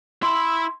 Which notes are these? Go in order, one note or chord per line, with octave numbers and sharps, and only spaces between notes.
E4 B5 C6